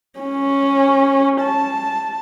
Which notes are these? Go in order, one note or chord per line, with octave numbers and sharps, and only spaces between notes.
C#4
A5